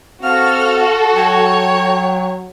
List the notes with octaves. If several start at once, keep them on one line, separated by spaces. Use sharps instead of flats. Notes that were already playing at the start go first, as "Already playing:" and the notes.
C4 F#4 A4 F5 F6
F#3 C#5 G5